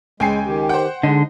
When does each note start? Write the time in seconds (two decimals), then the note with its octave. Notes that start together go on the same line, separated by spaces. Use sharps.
0.20 C#2 G#3 G5 G#5 C7
0.46 D#3 G4
0.69 C5 F#5 G5
1.03 D3 G#3 D#4